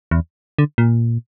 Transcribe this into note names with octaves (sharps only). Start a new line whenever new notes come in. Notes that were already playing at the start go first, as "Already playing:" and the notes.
E2
D3
A#2